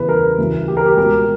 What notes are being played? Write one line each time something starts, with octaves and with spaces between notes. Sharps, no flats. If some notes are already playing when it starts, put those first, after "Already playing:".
Already playing: E2 C#3 E3 B4
A#4
D2 C#3 E3
G4
A#4
G4
C#2 B2 A#4